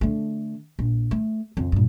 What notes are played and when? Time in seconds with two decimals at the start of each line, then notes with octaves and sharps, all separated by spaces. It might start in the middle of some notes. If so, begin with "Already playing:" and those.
0.01 D3 A3
0.79 A#1
1.11 A3
1.57 F2 C#3
1.72 G2 A#2